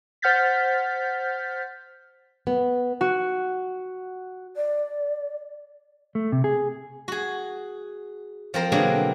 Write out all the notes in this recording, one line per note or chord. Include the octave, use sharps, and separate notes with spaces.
C5 F#5 F6 G6 A6 B6
B3
F#4
D5
A3
C3
G#4
F#4 G#4
F3 C4 A#4 C5
B2 D3 F#3 A#3 D4 G#4